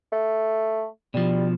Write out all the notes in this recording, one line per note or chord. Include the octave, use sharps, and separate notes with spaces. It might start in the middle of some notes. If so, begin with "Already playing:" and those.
A3
B2 F3 G3